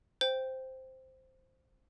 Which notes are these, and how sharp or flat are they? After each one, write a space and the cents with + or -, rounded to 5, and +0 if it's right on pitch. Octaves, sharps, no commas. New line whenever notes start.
C5 +0 G5 +0